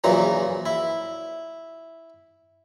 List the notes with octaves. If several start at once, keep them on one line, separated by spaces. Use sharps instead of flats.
A#1 A#2 C#3 E3 F#3 A#5
E4